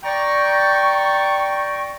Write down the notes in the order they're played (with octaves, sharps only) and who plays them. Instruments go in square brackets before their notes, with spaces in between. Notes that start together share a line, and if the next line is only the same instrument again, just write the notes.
[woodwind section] D5 G5 A#5 C#6